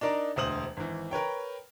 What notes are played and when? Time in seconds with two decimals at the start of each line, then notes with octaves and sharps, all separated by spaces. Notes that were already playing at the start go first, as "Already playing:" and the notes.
0.01 D4 D#4 A#4 D5
0.36 E1 D2 C5 D#6 F#7
0.77 G#1 E3
1.11 A#4 B4 C#5 G5